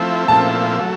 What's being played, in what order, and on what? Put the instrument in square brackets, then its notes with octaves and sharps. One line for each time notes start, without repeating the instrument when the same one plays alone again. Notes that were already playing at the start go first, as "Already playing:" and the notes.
Already playing: [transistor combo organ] F3 A3 C4 E4
[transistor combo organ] A#2 F3 A3 C4 E4 [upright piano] A5
[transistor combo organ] F#3 A3